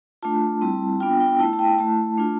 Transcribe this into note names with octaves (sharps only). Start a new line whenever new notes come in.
A3 D4 F4 A5
G3 C4 E4
B3 D4 F4 G5
G5
A3 E4 A5
A5
G5
A3 E4 A5
A3 D4 F4